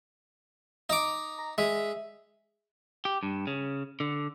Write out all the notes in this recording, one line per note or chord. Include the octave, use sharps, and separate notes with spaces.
D#4 D6
A#5
G#3 E5
G4
G2
C#3
D3